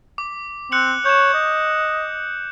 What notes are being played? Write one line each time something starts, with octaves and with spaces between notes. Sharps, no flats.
D6
C4 F#6 C#7 F#7
C#5 G6 E7
D#5